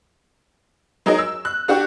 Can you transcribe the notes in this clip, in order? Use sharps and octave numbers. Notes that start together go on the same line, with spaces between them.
F#3 D#4 G#4 A#4 D#5
E6
F#6
D4 F#4 G4 F#5